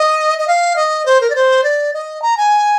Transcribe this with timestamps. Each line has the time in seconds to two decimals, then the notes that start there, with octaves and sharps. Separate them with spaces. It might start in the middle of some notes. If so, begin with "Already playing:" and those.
Already playing: D#5
0.39 D#5
0.48 F5
0.76 D#5
1.06 C5
1.21 A#4
1.30 D5
1.36 C5
1.64 D5
1.94 D#5
2.22 A#5
2.37 G#5